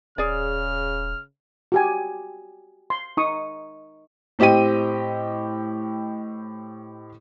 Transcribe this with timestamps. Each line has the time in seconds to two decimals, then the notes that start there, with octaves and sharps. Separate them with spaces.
0.18 D#1 C#3 G#4 D5 F6
1.72 F#4 G4 G#5
2.90 C6
3.17 D#4 C#6 D#6
4.39 A2 C4 G4 D#5 G5 D#7